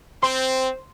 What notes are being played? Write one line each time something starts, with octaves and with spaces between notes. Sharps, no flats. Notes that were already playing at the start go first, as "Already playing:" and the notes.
C4 C5 C6